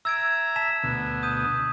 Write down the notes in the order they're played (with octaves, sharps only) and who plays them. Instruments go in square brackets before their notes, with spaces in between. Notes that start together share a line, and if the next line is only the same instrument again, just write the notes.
[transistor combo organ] E5 A#5 [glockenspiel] E6 G#6 D7
[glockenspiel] A5 B6 E7
[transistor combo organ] D2 B2
[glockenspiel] D#6 G6 D#7